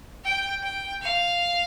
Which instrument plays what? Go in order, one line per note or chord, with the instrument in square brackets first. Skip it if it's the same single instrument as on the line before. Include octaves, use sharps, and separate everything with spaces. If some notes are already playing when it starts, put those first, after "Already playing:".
[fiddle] G5
G5
F5